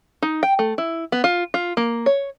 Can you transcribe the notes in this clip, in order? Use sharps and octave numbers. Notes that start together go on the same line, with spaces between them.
D#4
G5
A3
E4
B3
F4
F4
A#3
C#5